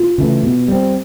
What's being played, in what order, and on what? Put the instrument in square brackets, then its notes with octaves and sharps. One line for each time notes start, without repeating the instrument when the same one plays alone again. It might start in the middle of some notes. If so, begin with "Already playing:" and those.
Already playing: [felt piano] F4
[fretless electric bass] C#3 E3 A3
B2
G3 C4